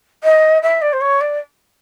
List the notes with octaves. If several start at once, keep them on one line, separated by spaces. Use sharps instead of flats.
D#5
E5
D5
C5
C#5
D5